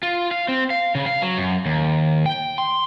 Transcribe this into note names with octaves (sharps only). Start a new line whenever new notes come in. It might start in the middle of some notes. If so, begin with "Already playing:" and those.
F4
F5
C4
F5
C#3
F5
F#3
F#2
D#2
G5
C6